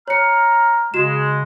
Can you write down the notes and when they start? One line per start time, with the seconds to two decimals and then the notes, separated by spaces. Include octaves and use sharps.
0.08 C#5 A#5 F6 C#7
0.94 C#3 G#3 F#4 E7